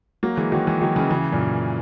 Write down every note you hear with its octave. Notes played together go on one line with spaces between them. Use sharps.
F#3 A#3
E3 G#3
D#3 F#3
E3 G#3
D#3 F#3
C#3 E3
C#3 E3
F#2 A#2